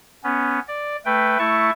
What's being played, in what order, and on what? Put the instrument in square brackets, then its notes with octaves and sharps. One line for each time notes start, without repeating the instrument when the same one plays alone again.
[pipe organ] B3 C#4
D5
A3 B4 G5
A3 E4 A5 C#6